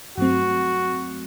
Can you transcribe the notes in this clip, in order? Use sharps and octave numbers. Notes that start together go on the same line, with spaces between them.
G2 F#3 A3 C4 F#4